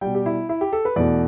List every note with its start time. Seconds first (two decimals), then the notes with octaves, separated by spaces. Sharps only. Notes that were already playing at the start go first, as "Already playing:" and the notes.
0.01 B2 G3 G5
0.15 G4
0.26 E4
0.49 E4
0.61 G4
0.73 A4
0.85 B4
0.96 E2 B2 A3 D5